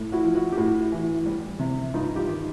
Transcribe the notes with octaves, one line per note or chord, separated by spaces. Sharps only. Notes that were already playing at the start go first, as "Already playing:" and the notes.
Already playing: A2
E4 F#4
F3
E4 F#4
G4
A2 E4 F#4
E3
G3
C3
G2 D#4 F4
F4 G4
D#3